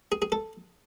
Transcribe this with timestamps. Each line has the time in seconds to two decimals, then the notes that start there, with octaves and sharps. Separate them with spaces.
0.12 G#4
0.22 G#4
0.32 A4